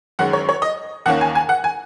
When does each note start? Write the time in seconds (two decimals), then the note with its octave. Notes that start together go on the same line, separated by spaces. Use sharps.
0.19 F#2 D#3 G#3 C#4 F#5
0.33 C#5
0.49 C#5
0.62 D#5
1.06 D#2 D#3 A#3 C#4 F#5
1.21 G#5
1.35 G#5
1.49 F#5
1.64 G#5